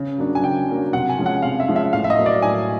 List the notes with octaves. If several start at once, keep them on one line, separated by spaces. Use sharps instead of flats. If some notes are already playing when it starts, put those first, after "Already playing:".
Already playing: C#3
F#3 A#3 D4
G#5
C#3 G5
F#3 A#3 D4
C3 F#5
G#5
F3 G#3 C#4
F#5
C3 F5
E5
F3 G#3 C#4
E5
A2 F5
E5
D#5
F#3 A#3
D5
A2 G#5